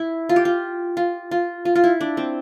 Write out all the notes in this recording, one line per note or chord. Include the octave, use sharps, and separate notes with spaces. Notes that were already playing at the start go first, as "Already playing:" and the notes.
Already playing: E4
F4
G4
F4
F4
F4
F4
F4
E4
D4
C4